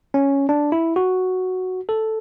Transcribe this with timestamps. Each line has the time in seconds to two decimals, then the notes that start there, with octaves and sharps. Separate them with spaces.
0.14 C#4
0.49 D4
0.72 E4
0.96 F#4
1.89 A4